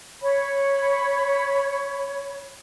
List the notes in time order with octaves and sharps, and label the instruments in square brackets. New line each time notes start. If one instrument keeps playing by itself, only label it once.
[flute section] C#5 B5